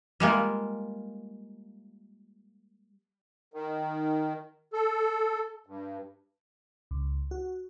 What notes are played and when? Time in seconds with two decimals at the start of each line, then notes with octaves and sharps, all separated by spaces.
0.20 G3 G#3 A#3 F4
3.54 D#3
4.73 A4
5.66 G2
6.91 C#2
7.31 F#4